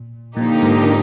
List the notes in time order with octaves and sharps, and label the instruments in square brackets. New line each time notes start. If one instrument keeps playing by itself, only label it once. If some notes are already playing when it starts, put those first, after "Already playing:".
Already playing: [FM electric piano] A#2
[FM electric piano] A#2 [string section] D3 F3 A#3 D#4 G4
[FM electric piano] G#2